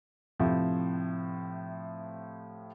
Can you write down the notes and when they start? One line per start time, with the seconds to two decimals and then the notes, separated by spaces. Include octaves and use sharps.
0.39 A2 C3 F3